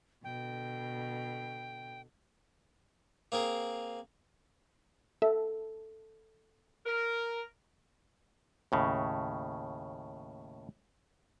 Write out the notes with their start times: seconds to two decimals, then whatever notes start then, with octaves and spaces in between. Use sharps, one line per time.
0.24 B2 D3 G5
3.32 A#3 C4 G#4 A#4
5.22 A4 E5
6.86 A#4
8.72 D#2 A2 C#3